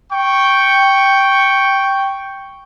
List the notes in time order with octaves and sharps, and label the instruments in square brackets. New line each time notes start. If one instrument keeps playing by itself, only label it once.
[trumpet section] G5 C#6